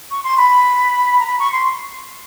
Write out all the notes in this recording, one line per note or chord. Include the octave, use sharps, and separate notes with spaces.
C#6
C6
B5
A#5
B5
C#6
C6